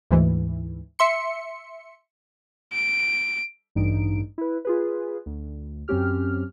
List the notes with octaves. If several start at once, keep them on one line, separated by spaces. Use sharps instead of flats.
D2 G#2 E3
E5 C6 C#7
D7
A1 G2 D#4 D7
E4 B4
F4 G#4 B4
D2
F#2 F#3 C4 C#4 G4 F6